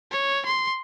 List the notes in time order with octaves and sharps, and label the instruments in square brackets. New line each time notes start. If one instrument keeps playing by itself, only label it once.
[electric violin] C#5
C6